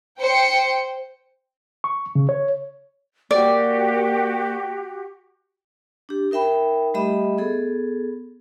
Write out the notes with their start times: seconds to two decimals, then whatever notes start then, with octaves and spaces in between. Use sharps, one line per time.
0.20 C5 G5 C#7
1.84 C#6
2.15 C#3
2.29 C#5
3.31 A#3 F#4 G4 D5
6.09 D4 G4
6.31 D#4 A#4 E5 G5 B5
6.94 G3 A3 G4 D#5 E5 B5
7.38 B3 G#4 A4